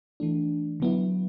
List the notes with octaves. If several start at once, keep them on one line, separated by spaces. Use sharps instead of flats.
E3 A3 D4
D3 F#3 B3 E4